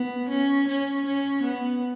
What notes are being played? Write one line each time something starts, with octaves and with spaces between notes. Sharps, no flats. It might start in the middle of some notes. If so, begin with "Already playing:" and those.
Already playing: B3
C#4
C#4
C#4
B3